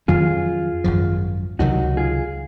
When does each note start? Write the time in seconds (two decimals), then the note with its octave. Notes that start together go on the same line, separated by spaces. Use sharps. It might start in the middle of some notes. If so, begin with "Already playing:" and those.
0.08 F2 D#3 F#3 C#4 F4 G#4
0.84 G#1 F#2 F3
1.59 C#2 C3 D#3 F#3 D#4 F#4
1.97 F4 G#4